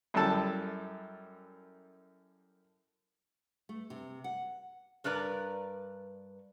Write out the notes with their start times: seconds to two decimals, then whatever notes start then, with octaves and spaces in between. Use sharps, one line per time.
0.14 F#2 G3 E4 A4 A5 E6
3.69 A3
3.90 C3
4.24 F#5
5.04 G2 A#4 B4 D5 A#5